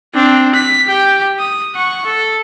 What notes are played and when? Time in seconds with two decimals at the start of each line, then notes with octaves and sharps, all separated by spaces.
0.14 C4 D4
0.55 B6
0.86 G4 G5
1.39 D#6
1.75 F#5 C#6
2.06 A4